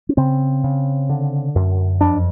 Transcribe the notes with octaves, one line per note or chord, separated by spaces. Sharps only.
C#4
C#3 C4
C#3
D3
F#2
F2 D4